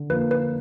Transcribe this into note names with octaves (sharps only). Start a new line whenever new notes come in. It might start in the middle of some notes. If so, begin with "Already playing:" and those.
Already playing: D3
F3 A#3 B4
B4